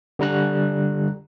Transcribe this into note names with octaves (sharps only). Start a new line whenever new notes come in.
D3 G3 A#5 F#6